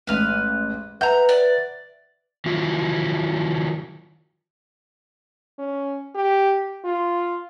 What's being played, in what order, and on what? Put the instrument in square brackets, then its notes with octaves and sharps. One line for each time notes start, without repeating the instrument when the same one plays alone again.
[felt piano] A1 G#2 [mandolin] B4 F6
[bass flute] B4 [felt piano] E5 F#5 [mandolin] A#5 G6
[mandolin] D5
[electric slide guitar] D#3 F#3 E4 F4
[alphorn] C#4
G4
F4